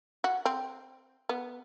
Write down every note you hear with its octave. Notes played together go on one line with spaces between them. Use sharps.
F#4
C4
B3